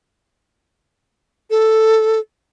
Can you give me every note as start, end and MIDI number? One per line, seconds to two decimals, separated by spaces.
1.50 2.20 69